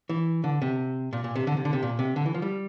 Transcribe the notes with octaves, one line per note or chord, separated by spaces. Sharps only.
E3
D3
C3
A#2
A#2
C3
D3
C3
D3
C3
A#2
C3
D3
E3
F3
G3